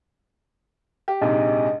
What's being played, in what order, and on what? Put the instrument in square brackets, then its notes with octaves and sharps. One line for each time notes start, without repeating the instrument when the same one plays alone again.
[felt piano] G4
[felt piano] A#1 G#2 C3 [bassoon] G#3